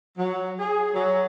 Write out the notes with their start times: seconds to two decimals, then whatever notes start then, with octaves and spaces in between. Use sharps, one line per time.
0.18 F#3
0.59 G#4
0.94 F#3